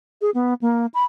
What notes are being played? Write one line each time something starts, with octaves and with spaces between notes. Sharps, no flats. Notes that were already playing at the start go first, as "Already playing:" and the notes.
G#4
B3
A#3
B5